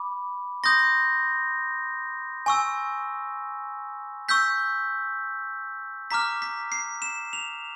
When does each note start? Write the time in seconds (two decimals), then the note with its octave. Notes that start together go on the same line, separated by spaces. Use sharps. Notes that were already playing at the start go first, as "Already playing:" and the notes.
Already playing: B5 D6
0.64 C6 D#6 G6 A#6
2.46 G#5 C#6 E6
4.29 C#6 E6 G6 B6
6.11 A#5 D6 F6 B6
6.42 B6
6.72 C7
7.02 E7
7.33 F7